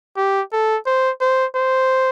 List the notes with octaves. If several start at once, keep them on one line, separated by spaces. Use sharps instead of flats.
G4
A4
C5
C5
C5